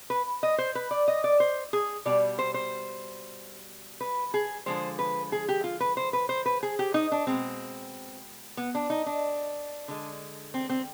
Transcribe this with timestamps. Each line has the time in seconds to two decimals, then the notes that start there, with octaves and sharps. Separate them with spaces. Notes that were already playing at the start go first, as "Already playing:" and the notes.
0.10 B4
0.43 D#5
0.58 C5
0.75 B4
0.91 D5
1.08 D#5
1.24 D5
1.40 C5
1.73 G#4
2.05 B2 G3 D5
2.39 C5
2.54 C5
4.01 B4
4.34 G#4
4.66 D3 F3 G#3 C5
4.99 B4
5.32 G#4
5.49 G4
5.64 F4
5.80 B4
5.97 C5
6.13 B4
6.29 C5
6.46 B4
6.63 G#4
6.79 G4
6.94 D#4
7.12 D4
7.27 B2 G#3 C4
8.57 B3
8.75 D4
8.90 D#4
9.06 D4
9.88 D3 G#3
10.54 C4
10.70 C4